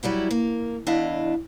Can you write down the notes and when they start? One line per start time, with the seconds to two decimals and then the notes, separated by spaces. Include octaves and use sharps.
0.03 F#3 G3 E4 B4
0.31 A#3
0.87 E2 D4 E4 D#5 F5